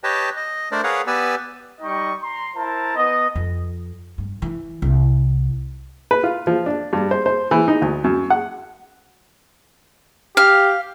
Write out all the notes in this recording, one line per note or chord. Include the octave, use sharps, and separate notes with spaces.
G4 B4 C#5 D#5 G5 A5
D#5
A3 D4 A#4 C5 D5
G#4 A#4 B4 C#5 F5 F#5
B3 G4 B4 D5 G#5 E6
G3 D#4 D#5 G5 C#6
A#5 C6
E4 A#4 C5 A5 A#5
B3 D#5
F2
G2
E3
C2
B4
F4
F3
D4
G2
C5
C5
E3
D#4
D2
F#2
F#5
G4 F5